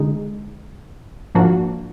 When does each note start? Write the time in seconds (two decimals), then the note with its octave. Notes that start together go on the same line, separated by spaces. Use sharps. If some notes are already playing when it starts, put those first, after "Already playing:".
Already playing: D3 G#3 D#4
1.35 G#2 F3 A#3 D4 F#4